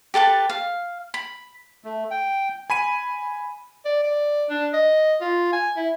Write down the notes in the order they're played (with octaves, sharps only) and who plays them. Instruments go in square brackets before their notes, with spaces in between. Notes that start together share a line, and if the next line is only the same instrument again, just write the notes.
[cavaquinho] G4 A4 B4 A5
F5
B5
[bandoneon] A3
G5
[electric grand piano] G#5 B5 D#7
[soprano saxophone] D5
D5
D4
D#5
F4
G#5
E4